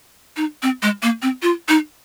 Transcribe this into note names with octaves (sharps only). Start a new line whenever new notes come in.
D#4
C4
G#3
A#3
C4
F4
D#4